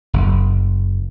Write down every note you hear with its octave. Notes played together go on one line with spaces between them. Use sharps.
F#1